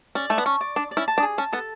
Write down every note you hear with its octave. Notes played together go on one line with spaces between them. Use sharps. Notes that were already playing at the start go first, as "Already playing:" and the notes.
C#4 D5
A3 A5
B3
C#4 C#6
D5
D4 D6
D5
C#4 E4
A5
D4
G#4
C#4 A5
B3 A4